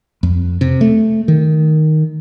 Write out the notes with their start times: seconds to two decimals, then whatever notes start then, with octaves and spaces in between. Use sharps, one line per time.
0.23 F2
0.61 C3
0.81 A3
1.28 D#3